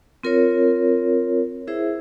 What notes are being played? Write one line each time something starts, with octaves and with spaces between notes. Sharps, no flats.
C4 F4 A#4 C#5
E4 G#4 C5 E5